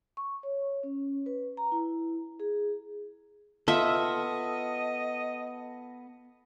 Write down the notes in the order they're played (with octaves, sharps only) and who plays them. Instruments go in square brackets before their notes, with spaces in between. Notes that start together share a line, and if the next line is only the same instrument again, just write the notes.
[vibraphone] C#6
C#5
C#4
B4
A#5
E4
G#4
[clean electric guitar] B3 A4 [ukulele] F4 [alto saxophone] D#5 [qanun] E5